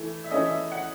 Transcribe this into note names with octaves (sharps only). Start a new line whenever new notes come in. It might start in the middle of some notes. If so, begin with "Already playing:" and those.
Already playing: E3 A3
E5
E3 A3 C#4 D#5
E5
F#5